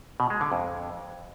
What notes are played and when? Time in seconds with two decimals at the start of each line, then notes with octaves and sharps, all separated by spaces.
0.20 B2
0.30 G#3
0.41 D3
0.52 F2